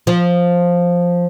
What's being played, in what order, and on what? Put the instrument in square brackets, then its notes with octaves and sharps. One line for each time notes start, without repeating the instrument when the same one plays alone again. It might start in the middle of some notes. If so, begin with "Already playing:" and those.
[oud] F3